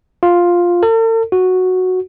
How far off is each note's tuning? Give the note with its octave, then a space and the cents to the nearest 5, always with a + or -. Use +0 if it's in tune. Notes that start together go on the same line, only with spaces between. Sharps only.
F4 +5
A4 +45
F#4 -5